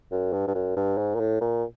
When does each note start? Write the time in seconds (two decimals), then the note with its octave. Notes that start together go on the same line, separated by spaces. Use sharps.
0.11 F#2
0.33 G2
0.48 G2
0.55 F#2
0.77 G2
0.98 G#2
1.15 A#2
1.20 A2
1.41 A#2